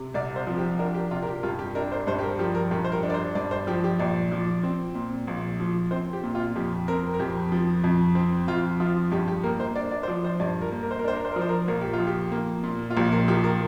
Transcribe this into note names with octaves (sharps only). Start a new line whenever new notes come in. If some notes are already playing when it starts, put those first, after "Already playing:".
Already playing: C3
C2 D5
C5
F3
G4
D4 A#4
G4
C3 F4
A#4
G4
G2 F4
G4
D4 A#4
C5
G2 C5
G4
A#4
F3 G4
A#4
G2 G4
C5
A#4
D4
D5
C5
G2 D5
C5
F3 G4
G4
A#1 D5
F3
C4
A#2
A#1
F3
C4 C5
G4
A#2
F4
F2 G4
C4 A#4
A#4
F2 G4
F3
F2
C4
F2 F4
F3 F4
G2 G4
G4
A#3 A#4
C5
D4 D5
D5
C5
F3 D5
C5
G2 D5
A#4
A#3
A#4
C5
A#4
D4 C5
A#4
C5
A#4
F3
C5
A#4
A#1 A#4
G4
F4
F3
G4
A#3
A#2
F4
A#1 G4
A#4
F3 G4
A#4